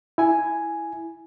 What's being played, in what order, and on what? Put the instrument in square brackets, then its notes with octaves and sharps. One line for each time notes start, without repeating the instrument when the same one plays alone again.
[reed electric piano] E4 G#5